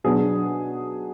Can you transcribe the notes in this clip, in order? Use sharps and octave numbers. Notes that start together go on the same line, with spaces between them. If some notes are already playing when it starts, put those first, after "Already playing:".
B2 F#3 B3 D4 G#4